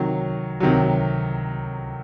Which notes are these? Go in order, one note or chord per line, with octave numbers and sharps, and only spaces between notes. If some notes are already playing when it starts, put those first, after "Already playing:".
Already playing: C3 D#3 F#3
C3 D#3 F#3